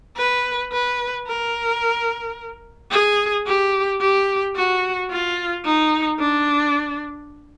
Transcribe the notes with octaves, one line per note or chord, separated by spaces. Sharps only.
B4
B4
A#4
G#4
G4
G4
F#4
F4
D#4
D4